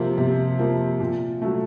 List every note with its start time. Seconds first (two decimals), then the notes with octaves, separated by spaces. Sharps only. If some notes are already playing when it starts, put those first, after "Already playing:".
Already playing: C3 F3 A#3
0.18 C3
0.59 F3 A#3
1.00 A#2
1.42 F#3 A3